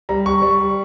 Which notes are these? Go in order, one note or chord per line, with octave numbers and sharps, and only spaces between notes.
G3 A#5
C#6
G3